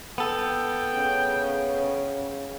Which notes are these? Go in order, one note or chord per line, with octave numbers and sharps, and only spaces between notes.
B3 A4 G5
C#3